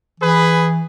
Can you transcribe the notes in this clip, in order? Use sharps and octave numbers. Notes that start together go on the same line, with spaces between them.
E3 G#4 B4